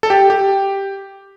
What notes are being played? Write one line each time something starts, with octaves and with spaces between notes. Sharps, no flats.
A4
G4
G4